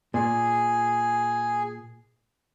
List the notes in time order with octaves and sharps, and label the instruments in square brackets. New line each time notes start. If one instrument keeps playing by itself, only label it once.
[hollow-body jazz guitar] A#2 [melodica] G#4